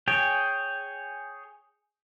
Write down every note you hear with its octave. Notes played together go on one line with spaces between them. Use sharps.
G#4 C#5 G5